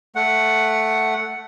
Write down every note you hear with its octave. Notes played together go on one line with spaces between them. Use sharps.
A3 F#5